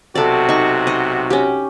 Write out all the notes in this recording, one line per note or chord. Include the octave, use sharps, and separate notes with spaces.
B1 C3 F#4 A4 D5
D#4 C#6
D#5
C#4 G4